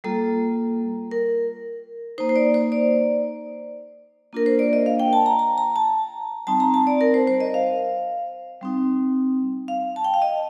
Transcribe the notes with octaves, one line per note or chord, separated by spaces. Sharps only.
G3 A#3 F4 A4
A#4
A#3 D#4 C5
C5
D5
C5
D5
A#3 D4 F4 A#4
C5
D5
D#5
F5
G5
A5
A#5
A#5
A#5
A5
G3 C4 D#4 A5
A#5
A5
D5
A#4
C5
C5
D#5
F5
G3 C4 D#4
F5
A5
G5
F5
D#5